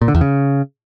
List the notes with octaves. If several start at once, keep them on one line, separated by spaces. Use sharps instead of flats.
A#2
D3
E2
C#3